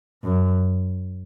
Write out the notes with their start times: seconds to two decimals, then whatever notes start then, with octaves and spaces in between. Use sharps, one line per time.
0.24 F#2